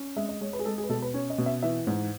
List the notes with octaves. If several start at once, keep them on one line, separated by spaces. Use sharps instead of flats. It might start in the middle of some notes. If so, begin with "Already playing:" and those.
Already playing: C#4
G#3 E5
D#5
G#3 C#5
B4
G#4
G#3 A4
G#4
B4
B2 A4
B4
C#4 C#5
D#5
B2
E5
E3 E5
G#2